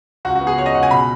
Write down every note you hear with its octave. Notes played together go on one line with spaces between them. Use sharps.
C#2 F#4
F#4
B3
G#4
C#2 C#5
D#5
C#2 F#5
G#5
B2 B5